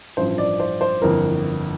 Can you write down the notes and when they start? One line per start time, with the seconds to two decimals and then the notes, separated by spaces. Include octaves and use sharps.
0.17 A1 G2 F3 C5
0.38 D5
0.60 C5
0.81 C5
1.02 G1 F2 E3 A#3 A#4